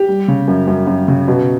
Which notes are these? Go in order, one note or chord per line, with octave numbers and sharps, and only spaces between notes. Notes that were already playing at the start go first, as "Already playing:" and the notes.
Already playing: G4
G3
C#3
F#2
F#2
F#2
C#3
B2